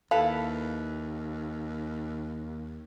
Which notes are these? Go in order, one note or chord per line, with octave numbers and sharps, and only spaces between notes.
D#2 E4 A4 B4 F5